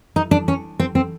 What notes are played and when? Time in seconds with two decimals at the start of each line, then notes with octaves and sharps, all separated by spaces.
0.16 D#4
0.31 D4
0.48 C#4
0.80 C4
0.95 C4